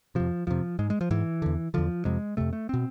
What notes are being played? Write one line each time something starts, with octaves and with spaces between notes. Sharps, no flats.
F2 C3 F3
F2 C3 F3
G#2 G#3
G#3
F3
G#2 E3
E2 D3
E2 D3 F3
F2 C3 G#3
F2 C3 A3
A3
B2 C4